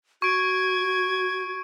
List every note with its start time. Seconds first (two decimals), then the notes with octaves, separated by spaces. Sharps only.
0.22 F#4 C#6 G#6 D7